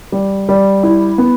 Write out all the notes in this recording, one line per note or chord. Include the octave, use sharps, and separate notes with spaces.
G3
G3
E4
B3